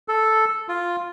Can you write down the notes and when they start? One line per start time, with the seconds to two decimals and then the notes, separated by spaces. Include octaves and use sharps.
0.08 A4
0.69 F4